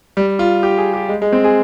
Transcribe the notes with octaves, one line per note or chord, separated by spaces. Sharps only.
G3
F4
G4
G#4
G4
G#3
G#3
C4
G#4